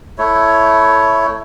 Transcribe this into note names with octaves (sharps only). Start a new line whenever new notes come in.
A3 E4 C#5